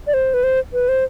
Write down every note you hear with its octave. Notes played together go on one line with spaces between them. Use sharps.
D5
C5
B4
C5
B4
C5